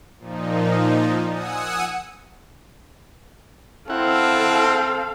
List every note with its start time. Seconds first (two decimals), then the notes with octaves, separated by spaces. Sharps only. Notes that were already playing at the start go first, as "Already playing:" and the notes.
0.18 A#2 F3 D#4
1.31 F#5 G#5 D#6 E6 C#7
3.90 C4 E4 A4 F5 F#5